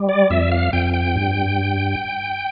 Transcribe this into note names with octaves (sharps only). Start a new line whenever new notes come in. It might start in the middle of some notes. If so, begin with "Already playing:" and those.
Already playing: G3
D5
F2 E5
F5
F2 G5
G5
G2